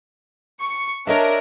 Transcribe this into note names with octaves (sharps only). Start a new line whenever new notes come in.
C#6
D4 A#4 C#5 D#5 E5